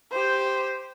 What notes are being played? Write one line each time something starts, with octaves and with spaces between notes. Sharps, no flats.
G4 C5